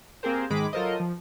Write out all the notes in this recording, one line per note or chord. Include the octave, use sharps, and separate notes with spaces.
A#3 C4 G4 G#4 A#4 C5
G#2 D#3 G#3 G#4 B5 D6
F#3 F4 A4 A#4 C5 D#5
F3